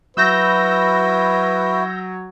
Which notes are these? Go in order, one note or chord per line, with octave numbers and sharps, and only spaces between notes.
F#3 E4 F#4 B4 E6 G6 A#6